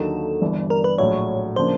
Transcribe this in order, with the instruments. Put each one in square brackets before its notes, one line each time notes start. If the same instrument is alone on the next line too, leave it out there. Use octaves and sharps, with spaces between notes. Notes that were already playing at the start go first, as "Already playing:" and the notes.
Already playing: [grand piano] D#2 D3 F#3 A#3 D#4 [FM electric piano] A4
[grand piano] G1 G2 E3
[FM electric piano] A#4
B4
[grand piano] A#1 A2 F#3 [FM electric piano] C#5
[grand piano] C#3 F3 A#3 D4 [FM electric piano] C5